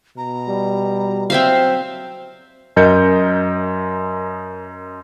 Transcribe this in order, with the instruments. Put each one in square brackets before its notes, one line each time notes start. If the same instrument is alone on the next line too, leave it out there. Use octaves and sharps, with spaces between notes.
[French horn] B2 [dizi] A#5
[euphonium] G3
[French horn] F#3 [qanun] C4 E5 F5 [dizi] C5
[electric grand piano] F#2 A#4 D#5 G6 C#7